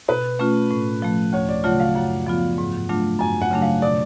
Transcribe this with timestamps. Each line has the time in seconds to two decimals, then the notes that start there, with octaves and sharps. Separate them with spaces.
0.08 B2 B4
0.39 A3 C#4 F4
0.71 A2
1.02 F3 A3
1.33 D2 C#5
1.49 D5
1.64 C#3 F#3 A3 F4 F#5
1.80 F5
1.95 F#2 F#5
2.26 F3 B3 F4
2.58 G#2
2.89 F#3 A3 D4 F4
3.20 F#2 G#5
3.41 F#5
3.51 C#3 F#3 A3 D4
3.62 F5
3.82 B2 D5